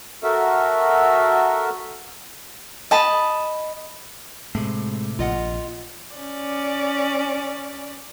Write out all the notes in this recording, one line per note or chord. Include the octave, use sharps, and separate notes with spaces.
F#4 A4 A#4 E5
D#5 A5 B5
A2 C3 G#3
A#1 F4 D#5 F#5
C#4 D5